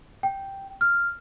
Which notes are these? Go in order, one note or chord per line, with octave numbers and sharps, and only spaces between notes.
G5
F6